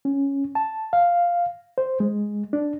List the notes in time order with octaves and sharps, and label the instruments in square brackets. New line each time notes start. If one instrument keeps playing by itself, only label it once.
[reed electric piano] C#4
A5
F5
C5
G#3
D4